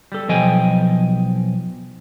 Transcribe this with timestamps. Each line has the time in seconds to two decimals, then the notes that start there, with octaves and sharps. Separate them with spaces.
0.12 G3 A4
0.28 B1 F3 D#5 G5 G#5